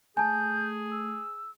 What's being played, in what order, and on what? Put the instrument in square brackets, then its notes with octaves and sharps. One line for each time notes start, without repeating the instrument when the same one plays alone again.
[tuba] A3 [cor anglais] G#4 [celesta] G#5 A5 [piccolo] G6
[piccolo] E6